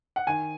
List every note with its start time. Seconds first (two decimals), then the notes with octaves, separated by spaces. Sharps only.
0.16 F#5
0.27 D#3 G#5